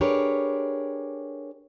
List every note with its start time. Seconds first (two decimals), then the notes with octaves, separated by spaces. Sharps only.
0.01 D4 G4 G#4 A#4 B4 C#5